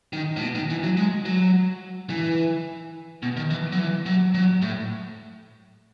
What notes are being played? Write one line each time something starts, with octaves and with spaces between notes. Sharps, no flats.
D#3
A2
B2
D#3
E3
F#3
G#3
F#3
E3
B2
D#3
E3
F#3
E3
F#3
F#3
A2